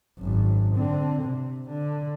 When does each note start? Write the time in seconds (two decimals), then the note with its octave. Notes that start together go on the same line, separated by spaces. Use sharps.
0.20 G#1 F#2
0.75 D3 C4
1.22 C3
1.69 D3